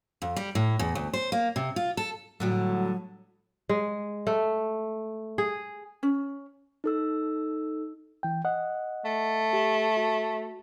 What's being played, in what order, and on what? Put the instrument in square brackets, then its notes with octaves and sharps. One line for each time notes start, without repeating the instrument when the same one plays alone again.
[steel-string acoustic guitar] F2
G3
A2
E2
D2
C5
A#3
C3
F4
A4
[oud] A2 D3 G3 [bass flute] F#3
[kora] G#3
A3
G#4
[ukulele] C#4
[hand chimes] D#4 A4 E6
[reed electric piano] E3 G5
D#5 F#5
[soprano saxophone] A3
[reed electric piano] G4
F#4